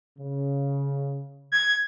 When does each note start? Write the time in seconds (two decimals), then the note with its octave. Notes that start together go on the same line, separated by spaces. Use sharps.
0.19 C#3
1.52 G#6